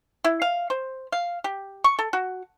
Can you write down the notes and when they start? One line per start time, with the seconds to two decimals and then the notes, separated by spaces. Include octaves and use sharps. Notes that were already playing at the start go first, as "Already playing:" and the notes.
0.24 E4
0.42 F5
0.70 C5
1.12 F5
1.44 G4
1.84 C#6
1.99 A4
2.13 F#4